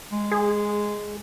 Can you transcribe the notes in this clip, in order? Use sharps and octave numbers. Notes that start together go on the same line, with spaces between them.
G#3
G#4